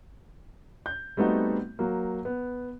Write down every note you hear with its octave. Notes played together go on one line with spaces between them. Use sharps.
G6
G3 A3 B3 C4 D#4 F#4
F#3 A#3
B3